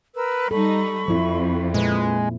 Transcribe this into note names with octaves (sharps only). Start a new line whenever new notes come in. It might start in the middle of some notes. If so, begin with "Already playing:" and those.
A#4 B4 E6
G3 D#4 A4 B5 C#6
F2 F3 E4
A#2 G#3 B4